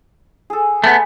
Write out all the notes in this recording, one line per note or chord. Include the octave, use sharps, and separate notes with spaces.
G#4 A4
G#3 A3 B3